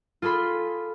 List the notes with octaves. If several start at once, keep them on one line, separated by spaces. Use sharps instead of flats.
F4 G#4 A4 B5 C6